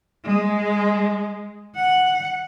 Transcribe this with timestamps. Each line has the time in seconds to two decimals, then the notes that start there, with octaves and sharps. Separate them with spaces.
0.25 G#3
1.75 F#5